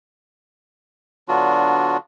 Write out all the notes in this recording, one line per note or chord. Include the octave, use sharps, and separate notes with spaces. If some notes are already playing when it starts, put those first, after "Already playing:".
D3 F#3 B3 D4 F4 F#4